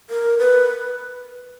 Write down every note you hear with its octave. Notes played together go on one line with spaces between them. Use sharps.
A#4
B4